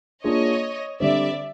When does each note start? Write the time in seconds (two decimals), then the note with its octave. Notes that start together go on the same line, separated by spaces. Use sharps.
0.24 A#3 D4 F4 G#4 C#5 D#5
1.00 D3 G3 C4 D5 E5